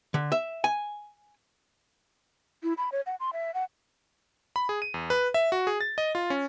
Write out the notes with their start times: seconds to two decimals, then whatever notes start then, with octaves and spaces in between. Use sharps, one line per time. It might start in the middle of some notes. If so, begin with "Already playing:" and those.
0.14 D3
0.32 E5
0.64 G#5
2.63 E4
2.78 B5
2.92 C#5
3.06 F#5
3.20 C6
3.33 E5
3.54 F#5
4.56 B5
4.69 G#4
4.82 D#7
4.94 E2
5.10 B4
5.34 E5
5.52 F#4
5.67 G#4
5.81 A6
5.98 D#5
6.15 F4
6.30 C#4